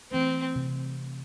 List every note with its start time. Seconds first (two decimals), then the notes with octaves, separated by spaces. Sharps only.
0.11 E3 A3 C4
0.56 C3